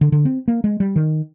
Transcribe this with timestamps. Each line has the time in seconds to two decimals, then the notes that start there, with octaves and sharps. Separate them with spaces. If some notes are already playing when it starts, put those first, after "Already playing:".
0.01 D3
0.12 D3
0.25 C4
0.48 A#3
0.64 G#3
0.80 G3
0.96 D#3